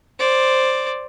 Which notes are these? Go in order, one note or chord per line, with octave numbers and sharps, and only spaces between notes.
C5 D5